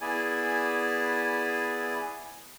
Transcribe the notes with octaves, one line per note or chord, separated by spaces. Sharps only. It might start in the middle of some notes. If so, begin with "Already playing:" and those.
B3 E4 G#4 D5 G#5